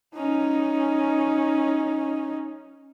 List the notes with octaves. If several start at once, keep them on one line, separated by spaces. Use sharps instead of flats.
C#4 D#4